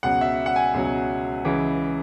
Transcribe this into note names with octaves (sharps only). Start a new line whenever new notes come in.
C#2 B2 F#3 F#5
E5
F#5
G#5
C#2 B2 F#3
C#2 C#3 E3